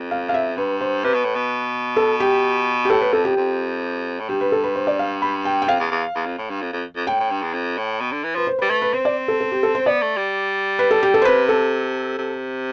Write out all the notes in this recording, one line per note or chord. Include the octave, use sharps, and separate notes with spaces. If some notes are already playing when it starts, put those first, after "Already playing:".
Already playing: F2
F5
F5
E5
G2 B4
C5
C3 B4
B2
A2
B2
A4
G4
G4
A2 A4
B4
F2 A4
G4
F2
A2
G2 G4
B4
A4
B4
C5
D5
F5
B5
G5
G5
F2 F5
E2
E2
E2
F2
A2
G2
F2
F2
F2
A2 G5
A2
G2
E2
F2
A2
B2
D3
E3
F3 B4
C5
B4
G3
A3 B4
B4
C4 C5
D5
A4
A4
G4
A4
C5
B3 D5
A3
G3
B4
A4
G4
A4
C5
C3 B4
A4
C3